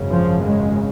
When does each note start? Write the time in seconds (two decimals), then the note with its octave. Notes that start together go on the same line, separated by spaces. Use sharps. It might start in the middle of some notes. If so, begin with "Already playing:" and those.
Already playing: G#1 F#2 C#3
0.08 F3
0.43 G#3